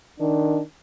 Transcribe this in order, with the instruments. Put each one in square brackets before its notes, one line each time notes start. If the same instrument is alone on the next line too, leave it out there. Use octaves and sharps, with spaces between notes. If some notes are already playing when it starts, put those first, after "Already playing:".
[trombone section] D#3 D4